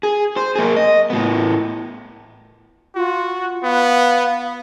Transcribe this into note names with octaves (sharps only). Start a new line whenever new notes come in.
G#4
C5
A#3 G#4
D#5
A2 B3
F4 F#4
B3 F5